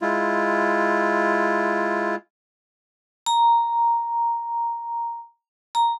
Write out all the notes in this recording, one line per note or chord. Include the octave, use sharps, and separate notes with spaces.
G#3 E4 F4
A#5
A#5